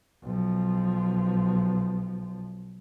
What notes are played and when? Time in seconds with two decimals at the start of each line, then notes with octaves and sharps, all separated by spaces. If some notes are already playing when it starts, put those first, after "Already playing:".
0.22 B1 F3